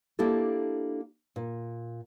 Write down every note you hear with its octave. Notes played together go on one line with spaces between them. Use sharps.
A#3 D4 E4 G4 A4
A#2